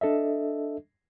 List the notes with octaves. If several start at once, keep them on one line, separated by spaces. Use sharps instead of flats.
D4 A4 D#5 E5